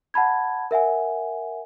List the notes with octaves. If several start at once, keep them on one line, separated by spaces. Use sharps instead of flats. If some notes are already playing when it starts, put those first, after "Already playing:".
F#5 A5 B5 G#6
A#4 E5 F#5 G#5